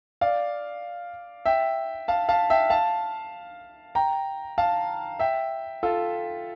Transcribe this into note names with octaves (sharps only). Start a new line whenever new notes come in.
D5 F5
E5 G5
F5 A5
F5 A5
E5 G5
F5 A5
G5 A#5
F5 A5
E5 G5
F4 A4